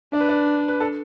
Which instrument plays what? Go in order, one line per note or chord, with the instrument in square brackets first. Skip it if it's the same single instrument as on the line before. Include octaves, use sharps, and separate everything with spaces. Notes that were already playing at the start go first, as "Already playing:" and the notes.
[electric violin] D4 [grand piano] D5
[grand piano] B4
D5
B4
A4